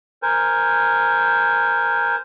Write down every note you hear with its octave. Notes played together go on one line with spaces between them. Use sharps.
A#4 C5 G#5